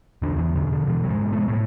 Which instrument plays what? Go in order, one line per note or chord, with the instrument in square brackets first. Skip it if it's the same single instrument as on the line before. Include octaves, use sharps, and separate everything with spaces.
[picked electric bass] E2 D3 D4
D3
E3
B2 D3
D3
B2 E3
F#3
G#2 G#3
B2
A3
G#3
A2 A3